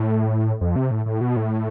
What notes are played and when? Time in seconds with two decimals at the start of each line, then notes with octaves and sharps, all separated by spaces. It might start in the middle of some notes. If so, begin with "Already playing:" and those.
Already playing: A2
0.61 F2
0.76 C3
0.91 A2
1.06 A2
1.21 B2
1.36 A2